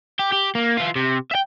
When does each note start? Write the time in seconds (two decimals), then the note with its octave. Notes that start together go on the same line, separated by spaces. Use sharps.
0.19 G4
0.32 G4
0.55 A#3
0.77 E3 F4
0.96 C3
1.31 E5 G5